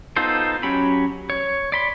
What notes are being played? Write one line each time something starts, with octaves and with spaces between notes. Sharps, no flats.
B3 D#4 F4 A4 C5
F#3 C#4 G4 B5
C#5
D5 B5 C6